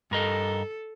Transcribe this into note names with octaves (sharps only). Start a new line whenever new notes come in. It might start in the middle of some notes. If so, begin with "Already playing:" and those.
G2 A4 A#4 D#5